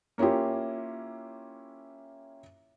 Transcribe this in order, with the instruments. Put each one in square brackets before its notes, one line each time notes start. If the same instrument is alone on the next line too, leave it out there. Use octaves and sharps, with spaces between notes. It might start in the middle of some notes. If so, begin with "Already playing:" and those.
[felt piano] A#3 C#4 E4 F4 G4